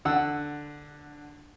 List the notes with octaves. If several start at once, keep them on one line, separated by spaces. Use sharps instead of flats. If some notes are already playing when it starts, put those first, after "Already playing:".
D3 F#5 E6